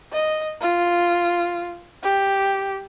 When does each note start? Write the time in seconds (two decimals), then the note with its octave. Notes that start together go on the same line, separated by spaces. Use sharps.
0.13 D#5
0.61 F4
2.03 G4